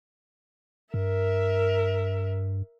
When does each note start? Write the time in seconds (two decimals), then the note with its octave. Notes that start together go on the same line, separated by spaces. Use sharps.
0.94 G2 A#4 E5